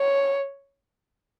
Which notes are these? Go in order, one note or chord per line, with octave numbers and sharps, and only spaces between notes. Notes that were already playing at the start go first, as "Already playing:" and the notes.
Already playing: C#5